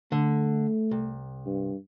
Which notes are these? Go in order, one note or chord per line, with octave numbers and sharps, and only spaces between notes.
D3 A3
C2
G2